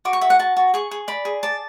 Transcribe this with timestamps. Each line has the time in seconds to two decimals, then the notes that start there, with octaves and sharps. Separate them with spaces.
0.05 F#4 D6
0.13 C#6
0.21 F#4 E5
0.30 F#5
0.39 F#4 A5
0.57 F#4
0.74 G#4 C#6
0.91 G#4
1.08 D5 B5
1.25 G#4
1.43 D5 A5